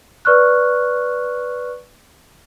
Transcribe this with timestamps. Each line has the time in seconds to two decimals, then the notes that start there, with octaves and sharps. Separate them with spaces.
0.25 B4 D5 C#6 F6 F#6